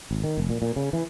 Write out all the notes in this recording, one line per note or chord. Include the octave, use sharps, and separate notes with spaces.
G#1
D#3
F1
A#2
A#2
C#3
E3